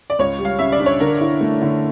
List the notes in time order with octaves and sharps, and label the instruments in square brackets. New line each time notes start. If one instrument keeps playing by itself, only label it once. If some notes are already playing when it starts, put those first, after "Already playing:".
[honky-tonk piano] D5
[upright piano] C#2 [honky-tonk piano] C#5
[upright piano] G3
[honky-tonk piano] F5
[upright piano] C#3 [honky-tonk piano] E5
[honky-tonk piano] D5
[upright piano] D4
[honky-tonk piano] C#5
[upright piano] D3 [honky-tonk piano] A#4
[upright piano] E4
A3
D3